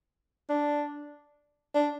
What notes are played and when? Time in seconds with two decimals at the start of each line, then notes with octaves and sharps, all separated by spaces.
0.50 D4
1.75 D4